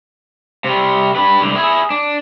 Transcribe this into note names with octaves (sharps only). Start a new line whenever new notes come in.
C3 G3
G3 B4
C2 D3
E4 G#4
D4